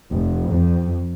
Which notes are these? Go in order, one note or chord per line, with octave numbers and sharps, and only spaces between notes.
F1
F2